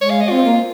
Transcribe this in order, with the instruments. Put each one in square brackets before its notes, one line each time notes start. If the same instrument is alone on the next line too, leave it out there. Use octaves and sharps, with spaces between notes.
[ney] G#3 [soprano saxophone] C#5
[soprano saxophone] F5
D#5
[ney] C4 [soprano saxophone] F4
[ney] A#3